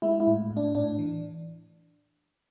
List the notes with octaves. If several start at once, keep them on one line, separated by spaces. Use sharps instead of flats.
G#3 E4
E4
A2
A2
D4
A2 D4
E3